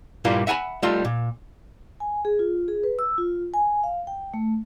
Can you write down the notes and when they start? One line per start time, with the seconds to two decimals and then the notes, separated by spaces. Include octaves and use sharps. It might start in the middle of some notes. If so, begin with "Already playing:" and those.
0.25 G2 A#2 G3 A#3 E4 F4
0.47 E5 F#5 G#5 A#5 B5
0.83 G3 A3 D#4 F4 C6
1.05 A#2
2.00 G#5
2.25 G#4
2.39 F4
2.68 G#4
2.84 B4
2.99 E6
3.18 F4
3.54 G#5
3.83 F5
4.07 G5
4.34 A3